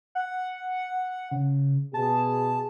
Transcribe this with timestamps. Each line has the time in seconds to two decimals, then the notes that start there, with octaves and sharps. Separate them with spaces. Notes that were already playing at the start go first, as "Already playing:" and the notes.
0.15 F#5
1.32 C#3
1.94 B2 G#4 A5